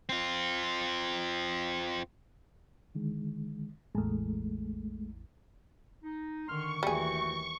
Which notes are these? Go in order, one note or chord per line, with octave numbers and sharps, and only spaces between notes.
C4 F4
D3 D#3 G#3
A1 E2 G#3 A3
D#4
D3 D#3 C6 C#6 F6
D#2 E3 G3 A3 F#4 G#4